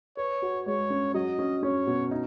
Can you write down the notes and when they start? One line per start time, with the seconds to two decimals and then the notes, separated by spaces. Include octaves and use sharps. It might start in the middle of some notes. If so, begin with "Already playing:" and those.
0.17 B4 C#5
0.42 F#4
0.66 G#3 C#5
0.90 C#4
1.14 F#3 D#5
1.39 C#4
1.63 C#4 C#5
1.87 B2
2.11 D#4